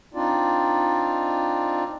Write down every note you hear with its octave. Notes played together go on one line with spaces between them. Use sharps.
C4 D4 D#4 F4 D5